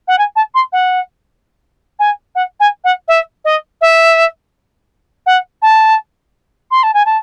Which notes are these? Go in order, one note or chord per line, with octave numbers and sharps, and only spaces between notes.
F#5
G#5
A5
C6
F#5
G#5
F#5
G#5
F#5
E5
D#5
E5
F#5
A5
C6
A5
G#5
A5